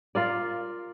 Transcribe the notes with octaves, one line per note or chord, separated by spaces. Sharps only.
F4 A#4 D5